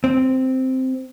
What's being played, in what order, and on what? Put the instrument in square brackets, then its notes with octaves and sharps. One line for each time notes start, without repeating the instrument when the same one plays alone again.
[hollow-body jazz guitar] C4